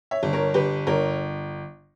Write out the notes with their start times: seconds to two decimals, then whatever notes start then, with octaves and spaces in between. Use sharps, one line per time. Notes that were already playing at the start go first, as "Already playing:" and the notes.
0.11 C#5 E5
0.23 G1
0.33 A#4 C#5
0.54 G1 G4 B4
0.87 G1 A#4 C#5